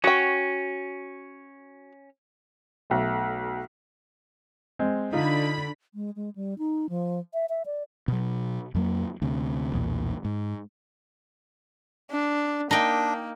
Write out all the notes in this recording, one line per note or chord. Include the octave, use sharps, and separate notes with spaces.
C#4 F#4 G5
B1 A3
G#3 C4
D3 D#4 F4 B5
G#3
G#3
G3
D#4
F3
E5
E5
D5
B2 F#3
F2 F#3 A#3
D2 C3
B1 E2 A#2
G#2
D4
A#3 D4 D#4 G5